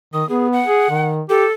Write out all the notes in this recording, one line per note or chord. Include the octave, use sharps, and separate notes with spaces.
D#3 D#6
B3 G#4
F#5
G#4
D#3
G4 A4